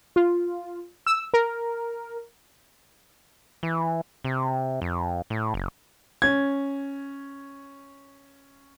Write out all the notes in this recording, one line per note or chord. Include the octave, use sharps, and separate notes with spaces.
F4
E6
A#4
E3
C3
F2
A2
F#1
C#4 G#6